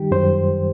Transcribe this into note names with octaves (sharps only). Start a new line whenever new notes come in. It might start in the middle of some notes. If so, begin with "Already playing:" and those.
Already playing: D#3 G3 G4
F#2 C5